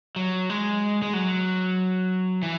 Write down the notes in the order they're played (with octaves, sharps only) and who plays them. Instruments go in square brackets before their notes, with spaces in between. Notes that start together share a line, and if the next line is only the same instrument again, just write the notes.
[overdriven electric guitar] F#3
G#3
G#3
F#3
E3